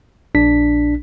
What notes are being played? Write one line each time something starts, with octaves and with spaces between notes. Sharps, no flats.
A#1 D4 B6